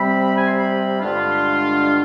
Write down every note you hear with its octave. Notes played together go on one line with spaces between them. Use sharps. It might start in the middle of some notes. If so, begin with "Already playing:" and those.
Already playing: C3 G3 C4 B5
G#5
C6
B5
G2 D3 G#3 D4 F4
B5
C6